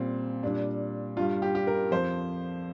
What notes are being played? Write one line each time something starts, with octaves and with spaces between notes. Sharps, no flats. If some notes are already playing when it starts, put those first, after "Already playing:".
Already playing: A#2 G3 C4
A#2 G3 D4
G2 G3 F4
G4
G4
A#4
F2 F3 C5